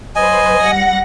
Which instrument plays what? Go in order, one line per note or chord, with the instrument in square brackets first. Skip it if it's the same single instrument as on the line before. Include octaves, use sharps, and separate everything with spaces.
[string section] F#3 B4 C5 [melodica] D#5 G#5
[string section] G3 F#5 A#6